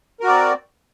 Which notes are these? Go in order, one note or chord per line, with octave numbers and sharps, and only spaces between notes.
C4 F#4 A#4 D5